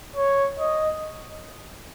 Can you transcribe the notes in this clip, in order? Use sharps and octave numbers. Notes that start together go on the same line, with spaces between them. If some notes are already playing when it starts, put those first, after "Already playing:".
C#5
D#5